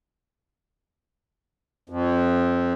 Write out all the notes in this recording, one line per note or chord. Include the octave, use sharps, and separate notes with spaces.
F2